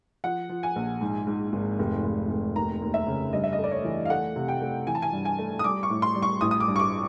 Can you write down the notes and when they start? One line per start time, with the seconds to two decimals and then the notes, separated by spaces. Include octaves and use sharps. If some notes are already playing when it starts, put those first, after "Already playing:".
0.24 F3 F#5
0.49 F3
0.63 G#5
0.76 A#1
1.01 G#2
1.27 G#2
1.53 G#1
1.79 F1
2.04 F1
2.30 F1
2.56 D#2 A#5
2.82 D#2
2.94 E5
3.07 C#3
3.33 G2 D#5
3.44 E5
3.53 D#5
3.59 A3
3.64 D5
3.71 C#5
3.84 E3
4.05 F5
4.10 A3 F#5
4.36 C3
4.48 G5
4.61 A3
4.87 E3 G#5
4.95 A5
5.02 G#5
5.13 G2
5.25 G#5
5.38 A3
5.59 D#6
5.64 G3 D6
5.83 C#6
5.90 A2
6.02 C6
6.15 G3
6.22 C#6
6.41 A1 D#6
6.51 D#6
6.60 D6
6.68 G2
6.76 C#6
6.79 D6